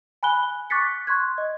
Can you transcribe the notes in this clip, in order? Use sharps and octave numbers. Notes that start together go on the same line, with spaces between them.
G#5 B5 F#6 G7
C#6 D6 F#6 A6 B6 C#7
C6 C#6 F#6 G#6
D#5